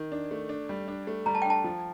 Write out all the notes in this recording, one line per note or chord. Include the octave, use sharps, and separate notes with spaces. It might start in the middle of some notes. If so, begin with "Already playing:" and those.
Already playing: D#3
D4
A3
D4
G3
D4
A3
G3 A#5
A5
D4 G5
A5
F3